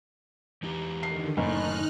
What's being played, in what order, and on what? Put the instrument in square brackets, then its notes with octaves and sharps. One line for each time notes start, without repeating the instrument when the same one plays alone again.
[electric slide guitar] E3 D#4 G4
[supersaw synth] D3 D#3 [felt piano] C7
[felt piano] F#1 [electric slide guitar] A2 [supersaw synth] D#4 F6 F#6